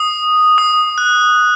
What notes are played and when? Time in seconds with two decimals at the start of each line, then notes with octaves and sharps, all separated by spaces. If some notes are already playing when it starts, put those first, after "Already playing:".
Already playing: D#6
0.58 D#6
0.98 F#6